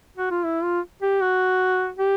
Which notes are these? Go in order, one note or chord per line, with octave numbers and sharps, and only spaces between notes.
F#4
F4
E4
F4
G4
F#4
G4